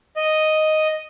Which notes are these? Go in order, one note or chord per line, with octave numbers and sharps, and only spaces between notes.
D#5